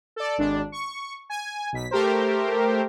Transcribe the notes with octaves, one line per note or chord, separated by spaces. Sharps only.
A4 D5
G#1 D4
C#6
G#5
B1 B6
A3 G4 A#4 C5